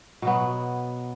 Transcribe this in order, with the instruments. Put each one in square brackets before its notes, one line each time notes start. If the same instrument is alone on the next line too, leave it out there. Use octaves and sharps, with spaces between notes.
[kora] B2 F#3 B3